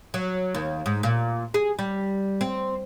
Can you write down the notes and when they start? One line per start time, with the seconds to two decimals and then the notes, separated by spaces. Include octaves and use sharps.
0.14 F#3
0.54 D#2
0.86 G#2
1.03 A#2
1.54 G#4
1.79 G3
2.41 C4